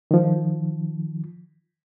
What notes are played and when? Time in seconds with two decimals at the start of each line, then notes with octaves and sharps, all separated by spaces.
0.11 D#3 F3